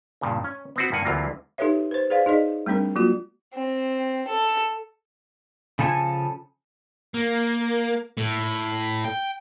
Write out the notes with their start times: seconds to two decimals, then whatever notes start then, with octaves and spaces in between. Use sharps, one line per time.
0.21 G2 A#2 C#3
0.44 C#4
0.76 B3 C4 F#4
0.92 G2 A#3 F#5 G#5
1.05 D2 C3 E3 F#3 A#3 F4
1.58 D#4 G4 A4 B4 C#5 E5
1.91 B4 C5
2.10 G#4 B4 C5 D5 F5
2.26 D#4 G#4 D5 D#5
2.66 G3 A3 C4 D4 A#4
2.96 F#3 A#3 F4 F#4
3.54 C4
4.28 A4
5.79 C#3 F3 A4 G#5
7.14 A#3
8.17 A2
9.04 G5